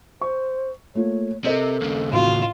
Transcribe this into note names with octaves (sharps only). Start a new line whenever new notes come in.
C5 C#6
A3 A#3 F4 C#5
C3 A4 A#4 C5 D#5
D#2 C#3
A1 F4 F#4